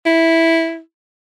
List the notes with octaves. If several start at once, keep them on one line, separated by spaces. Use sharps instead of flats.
E4